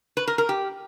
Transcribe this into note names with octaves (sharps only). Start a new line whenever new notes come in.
B4
A#4
A#4
G4